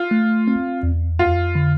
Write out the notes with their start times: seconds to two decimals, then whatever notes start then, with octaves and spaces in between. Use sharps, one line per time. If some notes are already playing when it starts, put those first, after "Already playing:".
Already playing: F4
0.11 A3
0.48 C4
0.83 E2
1.19 F2 F4
1.55 D3